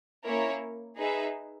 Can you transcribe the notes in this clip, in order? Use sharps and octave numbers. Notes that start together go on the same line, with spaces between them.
A#3 C#4 E4 A#4 C#5
D#4 G#4 B4 E5